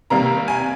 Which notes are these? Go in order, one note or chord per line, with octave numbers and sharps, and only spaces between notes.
C3 D#3 G3 A#3 A#5
G#5